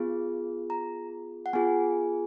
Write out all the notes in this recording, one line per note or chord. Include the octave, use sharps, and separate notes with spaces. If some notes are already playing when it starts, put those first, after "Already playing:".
Already playing: B3 F4 G#4
A#5
F#5
B3 F4 G#4 G#5